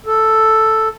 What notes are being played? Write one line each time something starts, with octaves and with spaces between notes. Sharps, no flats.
A4